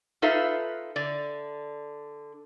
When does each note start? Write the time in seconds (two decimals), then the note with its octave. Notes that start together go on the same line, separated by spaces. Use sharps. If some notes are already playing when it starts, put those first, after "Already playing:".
0.22 D#4 F4 A4 B4 E5 F5
0.96 D3 D5